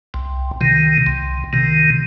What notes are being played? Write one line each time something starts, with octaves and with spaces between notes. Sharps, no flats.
C2
C3 D#3
C2
C3 D#3